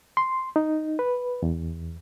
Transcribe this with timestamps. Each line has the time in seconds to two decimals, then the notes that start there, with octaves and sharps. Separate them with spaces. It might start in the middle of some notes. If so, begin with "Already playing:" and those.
0.17 C6
0.56 D#4
0.99 B4
1.43 E2